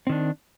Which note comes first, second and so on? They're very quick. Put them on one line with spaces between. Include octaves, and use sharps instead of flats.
C4 D#3 D4